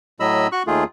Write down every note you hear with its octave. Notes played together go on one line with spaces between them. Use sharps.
A2 F#3 D#5 B5 E6
F#4 C#6 F#6
D#2 D#3 A3 F4 G#4